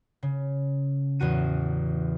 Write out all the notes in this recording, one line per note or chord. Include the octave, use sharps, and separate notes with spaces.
C#3
A1 E2 F#4 D#7